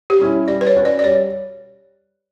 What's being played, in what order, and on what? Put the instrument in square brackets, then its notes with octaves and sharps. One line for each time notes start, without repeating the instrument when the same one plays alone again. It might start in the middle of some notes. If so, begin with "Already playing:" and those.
[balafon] G4
[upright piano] G3 C#4 E4
[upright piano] G3 [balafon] D5
[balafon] B4
C#5
[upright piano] C#4 F#4 B4
[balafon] D5
D5
[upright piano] G3 [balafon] C#5